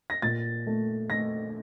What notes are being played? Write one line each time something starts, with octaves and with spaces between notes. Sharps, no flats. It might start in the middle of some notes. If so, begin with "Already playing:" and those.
A#6
A#2 A6
A3
A3 A#6